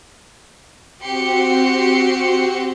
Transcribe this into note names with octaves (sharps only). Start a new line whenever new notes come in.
C4 F#4 G4 C6 C#7